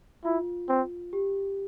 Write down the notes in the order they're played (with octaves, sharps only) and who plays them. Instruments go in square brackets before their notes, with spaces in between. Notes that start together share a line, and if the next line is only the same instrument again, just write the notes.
[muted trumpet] E4 [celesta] F4
[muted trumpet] C4
[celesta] G4